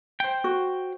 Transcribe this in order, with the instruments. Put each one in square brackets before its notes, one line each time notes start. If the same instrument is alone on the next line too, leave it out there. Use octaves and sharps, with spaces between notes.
[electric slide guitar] C5 G5
[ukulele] F#4